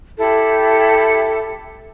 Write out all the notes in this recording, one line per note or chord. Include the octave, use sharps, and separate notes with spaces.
E4 G4 A4